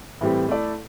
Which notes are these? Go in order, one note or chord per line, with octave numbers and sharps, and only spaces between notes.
A2 E3 G3 C4 G4
A3 E4 A4 D5